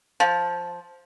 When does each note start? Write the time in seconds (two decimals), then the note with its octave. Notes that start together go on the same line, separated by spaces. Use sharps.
0.20 F3